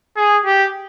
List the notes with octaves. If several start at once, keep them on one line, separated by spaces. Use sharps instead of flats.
G#4
G4